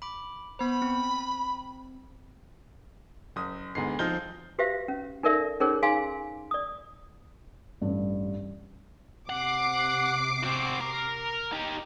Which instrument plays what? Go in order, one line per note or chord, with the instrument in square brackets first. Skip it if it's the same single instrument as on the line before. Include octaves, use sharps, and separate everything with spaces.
[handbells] B5 D6
[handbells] B3 C5 [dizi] B5
[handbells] C4
[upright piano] F#1 D#6
D2 G#2 B3 C7
F3 C4 D#4 F6 G6 G7
[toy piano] F#4 G4 B4 C5 E5 F5
C#4
D#4 A4 A#4 D5 E5
C#4 D#4 G#4 A#4 C5 C#5
D#4 G#4 F5 G#5 C6
D5 D#6
[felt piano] A1 G2
[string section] C3 D6 C7 [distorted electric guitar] F#5
[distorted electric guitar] C4 F#4
A#4
D#4 G4